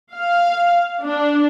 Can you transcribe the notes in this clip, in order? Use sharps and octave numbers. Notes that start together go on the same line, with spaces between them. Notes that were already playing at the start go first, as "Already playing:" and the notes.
F5
D4